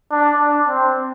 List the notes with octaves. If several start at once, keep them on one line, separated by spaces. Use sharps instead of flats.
D4
D4
C4